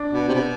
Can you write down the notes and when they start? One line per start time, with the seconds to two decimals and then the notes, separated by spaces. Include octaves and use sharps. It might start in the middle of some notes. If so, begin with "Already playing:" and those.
Already playing: D4
0.13 B2
0.28 C3
0.34 B2